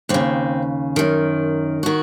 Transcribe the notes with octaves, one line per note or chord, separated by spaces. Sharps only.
D#2 C#3 C4
F#2 D#3
D#3 F#4